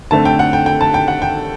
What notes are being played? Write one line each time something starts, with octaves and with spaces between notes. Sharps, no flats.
D3 A3 C4 A5
G5
F#5
G5
G5
A5
G5
F#5
G5